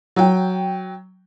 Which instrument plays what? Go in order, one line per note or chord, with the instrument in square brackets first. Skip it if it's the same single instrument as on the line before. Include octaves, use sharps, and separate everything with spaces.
[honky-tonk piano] F#3 G5